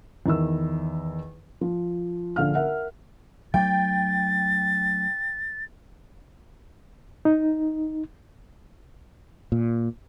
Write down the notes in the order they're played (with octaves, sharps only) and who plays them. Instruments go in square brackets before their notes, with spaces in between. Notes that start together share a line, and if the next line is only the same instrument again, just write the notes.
[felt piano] E2 D#3 E4 E6
F3
A#1 D3 F5 F6
A#4 E5 F#5
[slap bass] F#3 A3 D4 [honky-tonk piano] G5 [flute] A6
[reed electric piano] D#4
[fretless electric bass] A#2